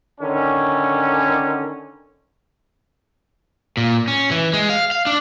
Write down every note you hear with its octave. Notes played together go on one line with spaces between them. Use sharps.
D3 D#3 C#4
A#2
C#4
E3
G#3
F5
F5
D4